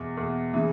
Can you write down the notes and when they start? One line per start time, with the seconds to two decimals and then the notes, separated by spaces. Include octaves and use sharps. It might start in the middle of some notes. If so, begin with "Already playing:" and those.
Already playing: E2 B2
0.17 E2 B2
0.54 C#3 E3